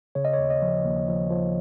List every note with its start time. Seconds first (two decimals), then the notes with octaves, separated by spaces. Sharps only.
0.15 C#3 C#5
0.25 D#5
0.33 C#5
0.39 D#2
0.50 D#5
0.62 F3
0.85 D#2
1.08 F3
1.30 F3